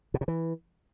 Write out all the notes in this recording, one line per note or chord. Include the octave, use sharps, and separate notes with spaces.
B2
C3
E3